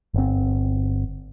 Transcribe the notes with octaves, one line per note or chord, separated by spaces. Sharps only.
G1 C4